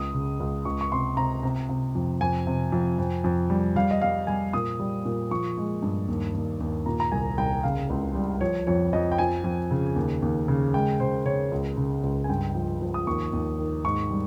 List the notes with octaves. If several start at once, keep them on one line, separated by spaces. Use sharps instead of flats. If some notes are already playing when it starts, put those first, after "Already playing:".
Already playing: C#2 D#6
C#3
C#2
C#2 C#6
C#6
C3 C6
C3 A#5
C3
C3
F2
F2 G#5
C3
F2
F2
F2
G3
G3 F5
D#5
G3 F5
G3 G#5
A#2 D#6
G3
A#2
F3 C#6
G#3
G2
D#2
D#2
D#2
A#2 A#5
A#5
C2 G#5
C2 G5
C#3 F5
C#2
G3
F3 C#5
F2 C#5
F2 D#5
G5
F3 G#5
F2
C#3
D#2
D#2
C#3
G#3 G5
C#3 C5
C#3 C#5
C#2
C#3
C#2
G#5
G2 G5
F3
F3
D#6
D#2 C#6
D#2
D#3
G#2 C#6
G3